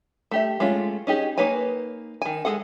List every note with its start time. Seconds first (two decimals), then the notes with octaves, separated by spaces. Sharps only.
0.31 A3 G4 E5
0.60 G#3 A3 C#4 F4
1.07 C#4 D#4 G4 G#4
1.38 A#3 D#4 B4 C#5 G#5
2.22 D#3 G#5
2.45 G#3 E4 G#4 A4 F#5